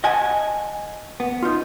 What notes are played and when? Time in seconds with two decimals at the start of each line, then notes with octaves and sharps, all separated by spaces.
0.04 D#5 F#5 G#5 A5
1.20 B3
1.43 D#4 F4